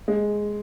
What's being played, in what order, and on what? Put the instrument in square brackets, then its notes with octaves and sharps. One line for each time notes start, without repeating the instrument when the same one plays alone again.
[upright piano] G#3